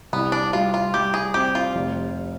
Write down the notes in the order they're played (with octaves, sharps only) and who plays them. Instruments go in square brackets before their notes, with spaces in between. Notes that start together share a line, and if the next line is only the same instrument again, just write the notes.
[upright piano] C2 [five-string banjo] B3
[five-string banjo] D4
[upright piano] G3 [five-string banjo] F4
[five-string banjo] F4
[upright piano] G3 [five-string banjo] G4
[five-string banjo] G#4
[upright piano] C4 [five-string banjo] G4
[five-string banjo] F4
[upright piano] F1